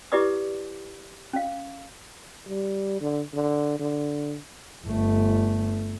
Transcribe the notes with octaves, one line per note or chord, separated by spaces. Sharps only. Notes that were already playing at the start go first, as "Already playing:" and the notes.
E4 G4 B4 D5 D6 D#6
C#4 F5
G3
D3
D3
D3
G1 A3